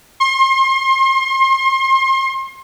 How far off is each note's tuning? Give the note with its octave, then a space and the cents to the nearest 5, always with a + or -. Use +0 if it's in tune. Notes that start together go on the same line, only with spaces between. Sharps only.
C6 +35